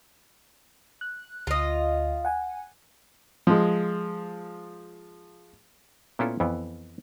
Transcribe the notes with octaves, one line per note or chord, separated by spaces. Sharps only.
F#6
D2 F4 D#5
F#5 G#5
F3 G#3
A#2 B3 C#4 E4 F4 A4
F2 E3 B3